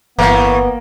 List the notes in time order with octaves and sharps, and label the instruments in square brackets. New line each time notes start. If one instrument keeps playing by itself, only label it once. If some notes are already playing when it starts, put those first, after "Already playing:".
[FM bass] G1 [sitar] A2 E3 [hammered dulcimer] A#3 [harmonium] B3